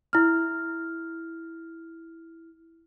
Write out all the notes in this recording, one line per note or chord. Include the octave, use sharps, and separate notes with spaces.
E4 F6